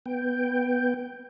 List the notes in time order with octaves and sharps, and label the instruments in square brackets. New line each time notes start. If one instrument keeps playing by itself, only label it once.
[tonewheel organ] B3 G5